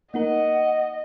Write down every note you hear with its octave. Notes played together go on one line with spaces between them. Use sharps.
A#3 D#4 A#4 D#5 F#5